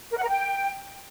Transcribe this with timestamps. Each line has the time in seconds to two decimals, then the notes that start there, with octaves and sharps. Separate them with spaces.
0.12 A#4
0.18 F#5
0.23 A#4
0.29 G5